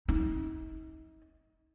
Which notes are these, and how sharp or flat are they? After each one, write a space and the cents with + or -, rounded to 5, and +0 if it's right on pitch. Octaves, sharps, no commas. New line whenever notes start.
D#4 +40